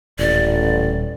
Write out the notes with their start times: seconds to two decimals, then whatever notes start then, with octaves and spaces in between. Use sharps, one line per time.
0.19 D#1 A1 D5